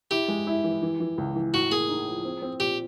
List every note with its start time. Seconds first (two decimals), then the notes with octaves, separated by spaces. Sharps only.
0.11 E4 G4
0.28 G#3
0.47 E4
0.64 E3
0.82 E3
1.00 E3
1.18 C#2
1.36 E3
1.53 A2 F#4
1.71 A#3 G#4
1.89 D#4
2.07 F3
2.25 C4
2.42 C4
2.60 A#2 G4